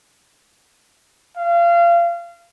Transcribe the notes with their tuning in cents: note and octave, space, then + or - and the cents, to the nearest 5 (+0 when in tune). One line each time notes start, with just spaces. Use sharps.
F5 -30